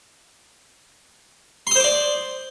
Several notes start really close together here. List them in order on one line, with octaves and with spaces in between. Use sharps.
C6 D#6 C5 D6 D5